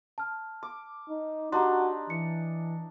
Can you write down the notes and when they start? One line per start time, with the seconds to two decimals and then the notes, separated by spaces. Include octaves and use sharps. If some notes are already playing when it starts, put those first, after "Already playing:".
0.18 A5 F6
0.63 D6
1.09 D#4
1.52 D4 D#4 F#4 G4 A#5 C6
2.10 E3 C#7